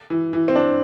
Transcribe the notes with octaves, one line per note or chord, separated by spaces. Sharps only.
E3
E3
C4
D4